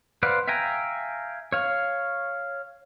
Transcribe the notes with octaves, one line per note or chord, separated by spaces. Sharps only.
B4 C5 D5 F5 F#5
E5 F5 G5 G#5 A#5
C#5 F5